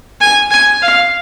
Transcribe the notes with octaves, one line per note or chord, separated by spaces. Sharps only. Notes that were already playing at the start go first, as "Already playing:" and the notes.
G#5
G#5
F5